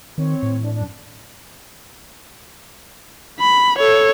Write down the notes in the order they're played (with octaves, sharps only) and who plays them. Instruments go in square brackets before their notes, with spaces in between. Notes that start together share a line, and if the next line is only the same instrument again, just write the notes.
[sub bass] D#3 [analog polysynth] C4 C#5
[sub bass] A2
[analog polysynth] E3 D4
F#2 D4
[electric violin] B5
A4 C#5